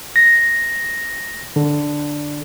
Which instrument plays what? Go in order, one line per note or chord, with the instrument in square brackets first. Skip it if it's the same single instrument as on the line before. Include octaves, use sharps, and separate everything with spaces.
[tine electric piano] A#6
D3